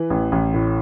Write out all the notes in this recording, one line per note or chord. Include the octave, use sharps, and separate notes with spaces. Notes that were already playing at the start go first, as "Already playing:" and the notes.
Already playing: E3 B4
A1
A1
A2